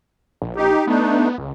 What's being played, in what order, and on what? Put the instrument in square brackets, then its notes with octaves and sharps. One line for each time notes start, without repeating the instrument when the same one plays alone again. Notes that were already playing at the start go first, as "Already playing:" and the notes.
[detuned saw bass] A#1
[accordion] D#4 G4
[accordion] A3 D4 D#4 [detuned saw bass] B3
[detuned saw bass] C#2